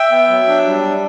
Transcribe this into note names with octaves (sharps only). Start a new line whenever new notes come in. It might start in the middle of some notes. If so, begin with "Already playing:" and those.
Already playing: E5 G5
B3
F#3
D4
G3